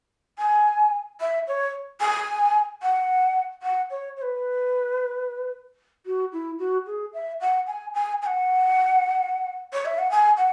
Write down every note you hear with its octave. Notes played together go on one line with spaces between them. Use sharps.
G#5
E5
C#5
G#5
F#5
F#5
C#5
C#5
B4
F#4
E4
F#4
G#4
E5
F#5
G#5
G#5
G#5
F#5
C#5
E5
F#5
G#5
F#5